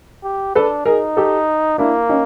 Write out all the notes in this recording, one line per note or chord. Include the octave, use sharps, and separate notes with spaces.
G4
D4 A4 B4
D#4 G#4 A#4
G4 A4
A#3 D4 E4
C#4 D#4